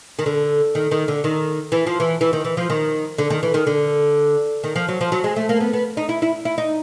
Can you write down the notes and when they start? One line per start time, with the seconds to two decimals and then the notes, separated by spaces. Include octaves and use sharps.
0.19 D#3
0.26 D3
0.75 D#3
0.91 D#3
1.08 D3
1.24 D#3
1.72 E3
1.87 F3
2.00 E3
2.21 E3
2.33 D#3
2.44 E3
2.57 F3
2.70 D#3
3.18 D3
3.30 D#3
3.43 E3
3.54 D#3
3.67 D3
4.64 D#3
4.76 F3
4.89 F#3
5.01 F3
5.12 F#3
5.24 G#3
5.36 A3
5.49 A#3
5.60 B3
5.73 B3
5.97 D#4
6.09 E4
6.22 E4
6.45 E4
6.58 D#4